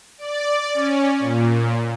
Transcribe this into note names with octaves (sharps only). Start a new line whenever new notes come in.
D5
C#4
A#2